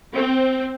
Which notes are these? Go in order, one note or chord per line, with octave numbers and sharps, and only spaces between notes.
C4